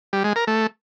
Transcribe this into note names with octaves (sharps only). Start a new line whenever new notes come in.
G3
G#3
A#4
A3